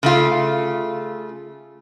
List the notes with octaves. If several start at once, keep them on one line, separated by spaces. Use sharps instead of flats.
C#3 A3 F4